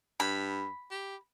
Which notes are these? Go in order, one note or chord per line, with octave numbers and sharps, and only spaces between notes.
G2 B5
G4